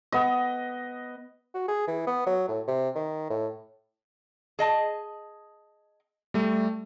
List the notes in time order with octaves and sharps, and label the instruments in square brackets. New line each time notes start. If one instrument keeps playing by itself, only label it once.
[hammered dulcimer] B3 D#5
[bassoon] F#4
G#4
E3
B3
F#3
A2
C3
D#3
A2
[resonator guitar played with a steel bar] G#4 D#5 A5
[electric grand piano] G3 A3